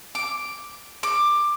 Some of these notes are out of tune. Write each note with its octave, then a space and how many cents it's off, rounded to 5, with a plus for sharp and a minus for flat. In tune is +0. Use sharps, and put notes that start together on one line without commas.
D6 +0
D6 +15